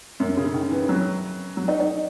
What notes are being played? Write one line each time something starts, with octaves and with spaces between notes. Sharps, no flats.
F#2
C#3
D#3
E3
F#3
F#3
D#4
D#4